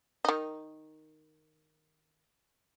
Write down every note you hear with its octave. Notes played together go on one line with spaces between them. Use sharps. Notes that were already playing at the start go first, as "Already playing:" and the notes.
D#3 D#4